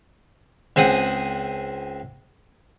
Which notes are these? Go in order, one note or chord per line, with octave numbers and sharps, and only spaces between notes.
C#2 C4 G#4 F#5 D#6